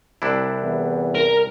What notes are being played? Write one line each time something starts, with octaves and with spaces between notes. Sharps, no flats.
C2 D4 E4
E2
A#4